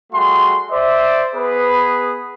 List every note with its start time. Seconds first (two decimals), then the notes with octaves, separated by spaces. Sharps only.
0.13 G3 A3 F#4 G#4 C6
0.71 C5 D5 E5
1.34 B3 G#4 B4